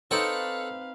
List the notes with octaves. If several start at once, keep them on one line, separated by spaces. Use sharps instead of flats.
C4 D#4 A4 B4 C#5 F5 F#5